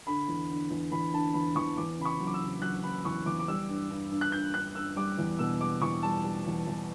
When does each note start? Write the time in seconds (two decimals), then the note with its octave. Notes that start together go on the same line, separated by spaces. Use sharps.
0.07 D3 B5
0.28 E2
0.50 D3
0.71 E2
0.92 E2 B5
1.13 D3 A5
1.34 E2 B5
1.55 E2 C#6
1.77 E2 D6
1.98 C#3 B5
2.05 C#6
2.20 F#3
2.27 D6
2.34 E6
2.41 C#3
2.62 F#3 F#6
2.83 C#3 B5
3.05 E2 C#6
3.26 E2 D6
3.39 D6
3.48 G3 E6
3.68 G2
3.90 G2
4.11 G2
4.21 F#6
4.32 G2 G6
4.54 G2 F#6
4.75 G2 E6
4.96 G3 D6
5.18 E2
5.39 B2 E6
5.61 G3 D6
5.82 E2 C#6
6.03 G3 A5
6.24 G3
6.46 E2
6.67 E2